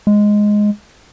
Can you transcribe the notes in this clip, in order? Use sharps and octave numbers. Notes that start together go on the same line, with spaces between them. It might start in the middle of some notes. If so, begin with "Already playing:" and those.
G#3